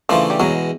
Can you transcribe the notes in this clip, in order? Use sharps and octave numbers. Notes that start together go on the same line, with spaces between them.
C#3 E3 F3 A3 D4
G3
E2 B2 F#3 G#3